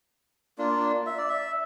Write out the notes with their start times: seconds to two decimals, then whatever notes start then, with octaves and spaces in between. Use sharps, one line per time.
0.58 A#3 D4 F4
1.06 E5
1.18 D5
1.29 E5